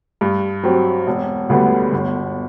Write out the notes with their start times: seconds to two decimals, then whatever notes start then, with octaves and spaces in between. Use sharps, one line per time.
0.21 G2
0.63 F#3 C4 G4
1.07 E1
1.49 D2 D3 G3 B3
1.92 G1